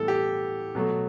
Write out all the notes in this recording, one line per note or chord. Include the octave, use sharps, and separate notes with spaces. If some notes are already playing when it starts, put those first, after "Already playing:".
Already playing: A2 E3 G3 B3 A4
G4
B2 F#3 A3